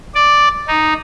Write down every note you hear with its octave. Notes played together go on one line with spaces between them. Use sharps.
D5
D#4